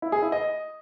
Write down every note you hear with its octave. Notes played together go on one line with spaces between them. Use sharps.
E4
G#4
E4
D#5